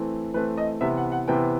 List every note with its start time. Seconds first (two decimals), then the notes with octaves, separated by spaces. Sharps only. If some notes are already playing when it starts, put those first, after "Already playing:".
Already playing: E3 A3 C4
0.34 E3 A3 C4 B4
0.57 D#5
0.81 C3 E3 B3 E5
0.97 F#5
1.12 F#5
1.28 C3 E3 B3 G5